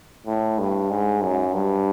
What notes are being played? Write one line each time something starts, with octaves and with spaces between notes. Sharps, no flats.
A2
G2
G#2
F#2
G2